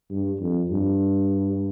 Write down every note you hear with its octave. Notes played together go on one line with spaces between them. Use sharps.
G2
F2
G2